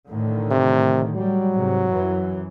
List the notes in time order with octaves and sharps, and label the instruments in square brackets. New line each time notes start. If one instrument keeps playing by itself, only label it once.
[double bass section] A2 D3 D#3
[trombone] C3
[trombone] F#3 [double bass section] G3
[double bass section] G#2 C3
F#2 E3